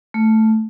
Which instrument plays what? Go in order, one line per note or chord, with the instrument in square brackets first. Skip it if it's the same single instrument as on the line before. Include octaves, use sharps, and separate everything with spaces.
[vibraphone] A3